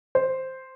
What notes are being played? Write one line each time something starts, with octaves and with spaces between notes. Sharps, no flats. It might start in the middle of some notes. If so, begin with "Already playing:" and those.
C5